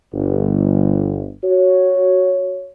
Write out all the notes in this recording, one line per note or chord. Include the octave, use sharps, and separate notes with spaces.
G1
F#4 C#5